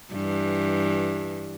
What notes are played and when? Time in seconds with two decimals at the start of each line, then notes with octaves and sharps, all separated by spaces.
0.13 G2 E3